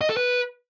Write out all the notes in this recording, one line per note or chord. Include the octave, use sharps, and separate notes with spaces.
D#5
A4
B4